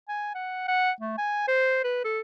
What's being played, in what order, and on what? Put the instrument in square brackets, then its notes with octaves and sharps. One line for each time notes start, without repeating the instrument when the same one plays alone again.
[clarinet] G#5
F#5
F#5
A3
G#5
C5
B4
A4